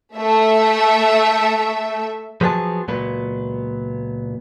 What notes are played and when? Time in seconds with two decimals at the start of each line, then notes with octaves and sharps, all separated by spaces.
0.17 A3 E5
2.41 F3 F#3 B3 G#4 B4 A5
2.88 C#2 A#2 F#3 B3